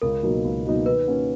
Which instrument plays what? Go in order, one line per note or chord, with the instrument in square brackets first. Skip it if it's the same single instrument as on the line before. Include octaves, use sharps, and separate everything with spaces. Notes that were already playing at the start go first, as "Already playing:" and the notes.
[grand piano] C#2 [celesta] A#4
[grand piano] B2 F#3 A#3 D#4
C#2
B2 F#3 A#3 D#4
[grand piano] D#3 [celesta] B4
[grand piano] A#3 C#4 F#4